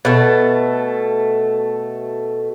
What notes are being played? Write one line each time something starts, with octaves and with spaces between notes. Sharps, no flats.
B2 A3